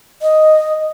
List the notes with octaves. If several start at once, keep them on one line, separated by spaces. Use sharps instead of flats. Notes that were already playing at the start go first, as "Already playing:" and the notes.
D#5